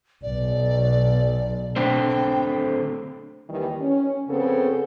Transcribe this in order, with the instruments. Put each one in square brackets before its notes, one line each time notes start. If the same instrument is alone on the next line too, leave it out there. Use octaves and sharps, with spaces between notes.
[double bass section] B1 [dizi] D5
[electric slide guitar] D3 A3 C4 [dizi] G5
[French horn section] D#2 D#3 E3 G3
C#4
F2 C#3 B3 C4 G#4 A4